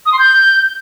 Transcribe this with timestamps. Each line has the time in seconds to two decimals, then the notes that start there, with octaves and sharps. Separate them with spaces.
0.06 D#6
0.12 C6
0.19 G6